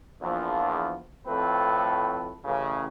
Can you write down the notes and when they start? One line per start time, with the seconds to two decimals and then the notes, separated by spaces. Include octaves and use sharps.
0.22 A#1 E2 F3
1.27 F2 A2 A3 C4 A4 B4
2.44 A1 C#3